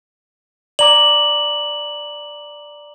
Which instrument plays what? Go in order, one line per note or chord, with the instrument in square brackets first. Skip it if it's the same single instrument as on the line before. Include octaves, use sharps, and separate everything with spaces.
[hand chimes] D5 A#5 D6 [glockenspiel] F#7